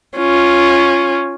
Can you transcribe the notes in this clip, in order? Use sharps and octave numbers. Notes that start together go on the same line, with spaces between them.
C#4 F4